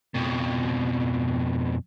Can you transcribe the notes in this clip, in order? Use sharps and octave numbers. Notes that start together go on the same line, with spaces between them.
F2 B2